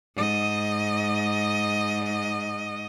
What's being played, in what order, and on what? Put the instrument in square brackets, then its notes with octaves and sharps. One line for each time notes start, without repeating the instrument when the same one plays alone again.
[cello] G#2 D#5